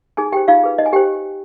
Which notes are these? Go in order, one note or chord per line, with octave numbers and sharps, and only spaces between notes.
D#4 G#4 G#5
G4 G5
C5
D#4 F4 F5
G#4 B4
D#4 D#5
G#5
G4 C5 G5